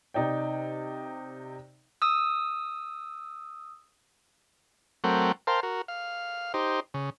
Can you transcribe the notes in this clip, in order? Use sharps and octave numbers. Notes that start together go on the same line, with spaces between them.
C3 D#4 D5 G5
D#6 E6
F#3 A3 C4 A#4 F#5 G5
A#4 C5 F5 G5 A5 C6
F#4 A#4
F5
D#4 G4 C5
C#3